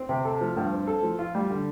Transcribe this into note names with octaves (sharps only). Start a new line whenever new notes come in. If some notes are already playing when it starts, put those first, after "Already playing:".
Already playing: C4
C3
A4
F3
G2
C4
A4
F3
F4
G3
D3